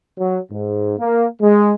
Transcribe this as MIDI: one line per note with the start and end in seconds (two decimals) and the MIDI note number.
0.18 0.38 54
0.50 0.93 44
0.98 1.25 58
1.40 1.72 56